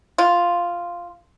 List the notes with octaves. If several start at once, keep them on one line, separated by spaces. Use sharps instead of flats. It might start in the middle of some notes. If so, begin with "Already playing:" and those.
F4